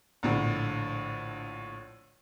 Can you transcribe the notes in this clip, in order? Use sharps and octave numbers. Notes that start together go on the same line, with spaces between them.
A#1 A2 D3